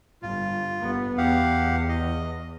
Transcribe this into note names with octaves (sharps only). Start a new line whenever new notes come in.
G1 F4
G1 B3
E2 G4 F5 F#5
D#5